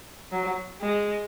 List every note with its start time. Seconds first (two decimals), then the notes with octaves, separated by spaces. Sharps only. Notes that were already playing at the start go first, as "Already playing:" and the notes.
0.32 F#3
0.81 G#3